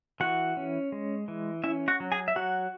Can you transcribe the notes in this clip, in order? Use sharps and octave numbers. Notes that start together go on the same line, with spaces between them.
E3 F#4 F#5
C#4
G#3
E3
C#4 E4 E5
F#4 F#5
F#3
G#4 G#5
E5
F#3 F#4 F#5